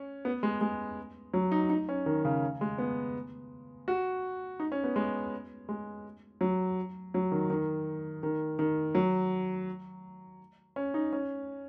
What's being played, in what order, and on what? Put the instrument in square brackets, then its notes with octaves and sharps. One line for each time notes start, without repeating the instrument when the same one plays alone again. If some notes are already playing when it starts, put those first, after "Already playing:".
Already playing: [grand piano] C#4
B3
G#3
G#3
F#3
D#4
D#4
C#4
D#3
C#3
G#3
B3
F#4
D#4
C#4
B3
G#3
G#3
F#3
F#3
D#3
D#3
D#3
D#3
F#3
C#4
D#4
C#4